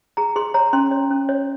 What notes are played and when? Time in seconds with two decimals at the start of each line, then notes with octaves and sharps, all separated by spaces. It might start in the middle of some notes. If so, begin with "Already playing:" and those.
0.17 G#4 A#5
0.36 G#4 C6
0.54 C#5 A#5
0.73 C#4 C6
0.91 C#5
1.10 C#4
1.29 C#5